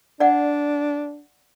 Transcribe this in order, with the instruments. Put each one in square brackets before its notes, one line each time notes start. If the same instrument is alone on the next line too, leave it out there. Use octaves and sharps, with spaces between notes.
[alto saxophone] D4 [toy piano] D5 F#5